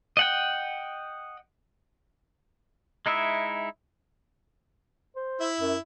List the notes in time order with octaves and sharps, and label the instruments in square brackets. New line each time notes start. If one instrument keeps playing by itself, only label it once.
[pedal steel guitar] D#5 F#5 G5
G#3 D#4 E4 E5
[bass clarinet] C5
[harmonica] E4 E5
[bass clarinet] F#2